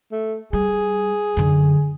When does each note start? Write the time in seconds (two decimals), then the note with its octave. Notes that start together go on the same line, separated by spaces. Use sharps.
0.12 A3
0.53 G3 G#4
1.37 F#2 D3